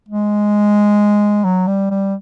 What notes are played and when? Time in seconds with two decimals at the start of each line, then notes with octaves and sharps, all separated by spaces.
0.08 G#3
1.44 F#3
1.67 G3
1.90 G3